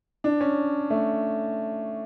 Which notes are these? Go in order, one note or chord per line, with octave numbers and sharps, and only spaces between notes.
D4
C#4
A3